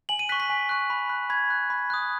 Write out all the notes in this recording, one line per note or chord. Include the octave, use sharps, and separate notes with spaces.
G#5 F#7
D#7
C#6 F#6 B6
B6
G#5
C#6 F#6
B5
F#6
B5 G#6
F#6
B5
D#6 F#6